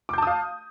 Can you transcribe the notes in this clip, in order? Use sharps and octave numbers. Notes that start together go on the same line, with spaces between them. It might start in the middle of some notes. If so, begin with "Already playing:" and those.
F5 A5 D6 D#6 G6